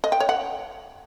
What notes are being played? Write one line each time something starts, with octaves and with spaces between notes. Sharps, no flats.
D#5
G5
C#5
F#5